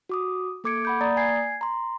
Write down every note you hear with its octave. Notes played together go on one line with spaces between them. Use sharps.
F#4 D6 D#6
A#3 A4 D6 G#6 C#7 D7
F#5 B5 G6
A#3 D5 A#5 D#6 A6
G#5 G#6 C7
A#5 C6